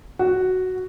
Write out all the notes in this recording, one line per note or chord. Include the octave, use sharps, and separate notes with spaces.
F#4